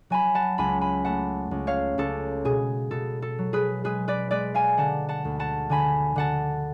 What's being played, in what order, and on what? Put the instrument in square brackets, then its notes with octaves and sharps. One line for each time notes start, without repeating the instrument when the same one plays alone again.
[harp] F#3 G#5 B5
F#5 A5
C#2 G#5 B5
G#5 B5
A3 F#5 A5
C#2
C#5 F5
C#2 A4
B2 G#4
B2 A4
A4
F#3
G#4 B4
G#3 G#4 B4
B4 D5
G#3 B4 D5
F5 G#5
D3 F#5 A5
F#5 A5
D2
F#5 A5
D3 G#5 B5
D3 F#5 A5